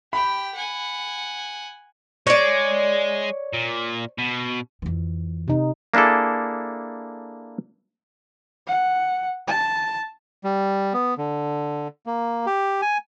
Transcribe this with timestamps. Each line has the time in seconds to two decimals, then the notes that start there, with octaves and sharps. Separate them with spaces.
0.13 G4 G5 B5
0.54 F#5 G#5
2.27 G#3 C#5 D5
3.53 A#2
4.19 B2
4.82 F2 E3
5.48 C3 D#4
5.94 A#3 D4 E4 G#4 A4
8.67 F#5
9.47 A5
10.44 G3
10.94 B3
11.18 D3
12.06 A#3
12.46 G4
12.82 G#5